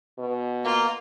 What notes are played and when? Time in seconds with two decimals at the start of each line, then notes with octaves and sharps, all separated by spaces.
0.19 B2
0.65 A#3 F4